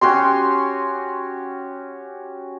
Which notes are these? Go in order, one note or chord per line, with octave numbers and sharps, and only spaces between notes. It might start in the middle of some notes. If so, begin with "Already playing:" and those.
C#4 F#4 G4 C6